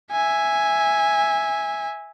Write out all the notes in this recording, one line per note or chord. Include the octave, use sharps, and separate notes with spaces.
E5 G#5